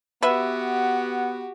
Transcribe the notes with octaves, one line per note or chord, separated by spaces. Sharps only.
B3 F#4 G4 B4 E5